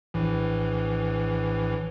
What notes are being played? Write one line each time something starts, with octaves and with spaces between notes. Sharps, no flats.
A#1 A2 E3